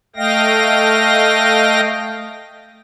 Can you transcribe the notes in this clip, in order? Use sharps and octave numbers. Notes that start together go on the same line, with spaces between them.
A3 D#5 F5 G5 A#6